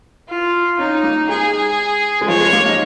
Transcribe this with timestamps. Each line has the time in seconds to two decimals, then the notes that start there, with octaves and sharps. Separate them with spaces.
0.29 F4
0.79 C#4 D#4
1.03 A#3
1.29 G#3 G#4
2.21 G#3
2.28 F3 C#5
2.41 G#3
2.53 A#3
2.66 D#4